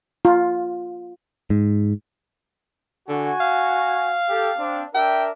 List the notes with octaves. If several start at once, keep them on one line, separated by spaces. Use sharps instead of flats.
F4
G#2
D3 F#4 G#5
F5
G4 A4
C4 D4
D4 A#4 E5 G5